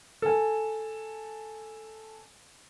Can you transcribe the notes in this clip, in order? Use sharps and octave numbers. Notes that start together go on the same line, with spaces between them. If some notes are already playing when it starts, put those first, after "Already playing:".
A4 G#5